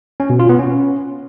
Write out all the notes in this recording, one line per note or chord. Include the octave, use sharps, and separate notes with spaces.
C#4
B2
F4
B3
C#4